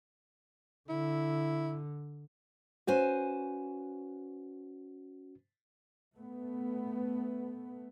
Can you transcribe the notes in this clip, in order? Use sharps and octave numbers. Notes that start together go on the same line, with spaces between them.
D3 E4
C#4 F#4 B4 C5 G#5
A3 B3